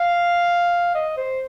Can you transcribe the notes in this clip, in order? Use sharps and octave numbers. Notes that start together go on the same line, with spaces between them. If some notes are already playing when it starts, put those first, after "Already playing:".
Already playing: F5
D#5
C5